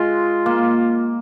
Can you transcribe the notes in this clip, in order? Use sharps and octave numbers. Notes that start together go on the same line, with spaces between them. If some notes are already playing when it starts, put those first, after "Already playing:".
Already playing: G#3 F4
A#3